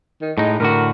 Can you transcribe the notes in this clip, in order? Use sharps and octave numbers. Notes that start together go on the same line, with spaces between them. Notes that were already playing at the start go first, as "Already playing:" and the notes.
D#3
A2 G#3 D#4
A2 D3 F#4 A#4